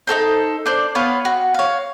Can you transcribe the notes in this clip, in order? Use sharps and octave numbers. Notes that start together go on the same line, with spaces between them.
D#4 F#4 A4 C5
D4 C5 D5
B3 F4 B4 C#5
F#4
C#5 F5